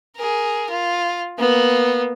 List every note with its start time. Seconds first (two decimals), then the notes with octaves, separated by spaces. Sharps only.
0.16 G#4 A#4
0.70 F4
1.39 A#3 B3